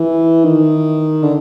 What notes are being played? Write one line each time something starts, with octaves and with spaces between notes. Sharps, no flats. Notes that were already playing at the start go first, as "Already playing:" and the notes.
Already playing: E3
D#3
D3